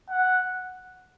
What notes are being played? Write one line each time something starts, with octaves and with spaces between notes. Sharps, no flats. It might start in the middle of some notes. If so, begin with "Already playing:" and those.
F#5